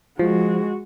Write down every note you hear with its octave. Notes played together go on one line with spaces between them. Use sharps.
F3 G#3 F#4